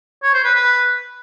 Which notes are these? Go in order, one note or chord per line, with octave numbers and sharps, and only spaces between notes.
C#5
C5
B4
B4